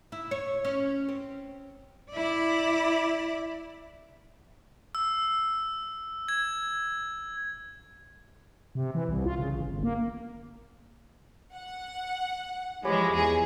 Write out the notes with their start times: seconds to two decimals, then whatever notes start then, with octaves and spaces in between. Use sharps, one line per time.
0.12 E4
0.31 C#5
0.65 C#4
1.09 C4
2.10 E4 D5
4.95 E6
6.28 G#6
8.75 C3
8.95 E3
9.09 C2
9.26 F4
9.39 C#3
9.54 A1
9.69 G1
9.83 A#3
11.55 F#5
12.85 E3 F3 G#3 G4 C#5 B5
13.13 E2 G#4 G#5